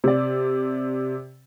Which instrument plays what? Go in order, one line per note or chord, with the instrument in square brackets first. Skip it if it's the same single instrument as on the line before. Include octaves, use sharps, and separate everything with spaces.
[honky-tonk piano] C3 D5